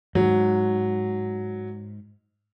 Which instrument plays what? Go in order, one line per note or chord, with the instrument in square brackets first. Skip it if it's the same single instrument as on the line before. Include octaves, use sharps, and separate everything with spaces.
[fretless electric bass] G#2 [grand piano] F#3